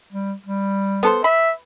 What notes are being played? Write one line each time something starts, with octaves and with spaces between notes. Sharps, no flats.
G3
G3
B3 A4 C5
E5 B5